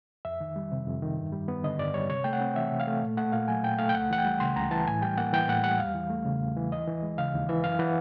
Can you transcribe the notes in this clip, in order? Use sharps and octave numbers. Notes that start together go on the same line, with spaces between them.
F2 E5
D#3
G3
C3
F2
D#3
G2
G3
B3
D3 D#5
G2 D5
G3 C#5
C3 C#5
A3 G5
F#5
C4
E3 E5
C3
F5
A3
A#2
A3 F#5
A#2 F5
F#3 G#5
A#2 G5
A3 F5
G5
C#2 F#5
E3 F#5
G5
G3
C#3 C6
C#2 A#5
E3 A5
A2 G#5
G3 G5
A#3 F#5
E3 G5
A2 F#5
G3 F#5
E2 F5
E3
A3
C#3
E2
E3
D#2 D#5
E3
G#3
C#3 F5
D#2
E3 E5
F#2 F5
E3 F#5